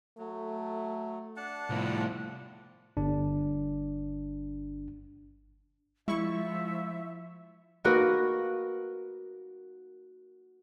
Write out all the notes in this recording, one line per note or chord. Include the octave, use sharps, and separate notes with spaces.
F#3 A3
D4 F#5 A5
C2 A2 F3
G1 D4
F3 G#3 E4 E5 C#6
A#3 D#4 F#4 A#4 B4